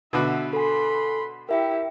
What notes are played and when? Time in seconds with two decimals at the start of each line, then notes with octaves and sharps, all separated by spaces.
0.13 B2 D3 F#4 E5
0.53 A4 G#5 B5 C6
1.49 E4 G4 A#4 E5 G5